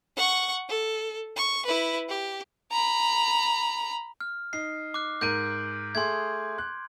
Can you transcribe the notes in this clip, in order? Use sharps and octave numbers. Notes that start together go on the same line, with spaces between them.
F#5 C#6
A4
C#6
E4 B4
G4
A#5 B5
F6
D#4 C7
D6 F#6
G#2 A#4 G6 D7 D#7
A3 G#4 C6 G#6
F#6